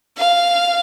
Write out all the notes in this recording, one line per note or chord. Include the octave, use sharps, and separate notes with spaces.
F5